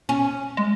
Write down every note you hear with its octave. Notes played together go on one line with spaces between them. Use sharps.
C#4
G#3